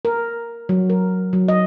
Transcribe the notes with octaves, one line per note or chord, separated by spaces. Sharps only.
A#4
F#3
A#4
F#3
D#5